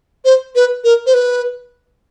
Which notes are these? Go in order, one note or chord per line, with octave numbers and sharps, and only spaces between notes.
C5
B4
A#4
C5
B4